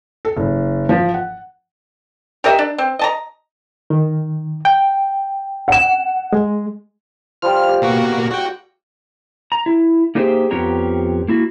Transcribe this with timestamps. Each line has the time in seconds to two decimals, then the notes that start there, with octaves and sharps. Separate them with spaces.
0.25 A4
0.37 F#1
0.89 F3
1.14 F#5
2.44 G4 A#4 D#5 E5
2.59 D4
2.78 C4
2.99 D#5 A5 A#5
3.90 D#3
4.65 G5
5.68 F#5 E7
6.33 G#3
7.42 F3 G3 F6
7.68 G4
7.82 B2 A#3 F#4
8.31 F#4 G5
9.52 A#5
9.66 E4
10.15 A#3 D#4 G4 G#4 C5 E5
10.51 F2 F3 B3 G4 C#5 A#5
11.28 A#3 E4 F#4